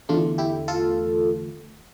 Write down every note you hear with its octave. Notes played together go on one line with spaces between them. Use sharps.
E2 D3 A3 D4 F4
E4 G4
F4 A4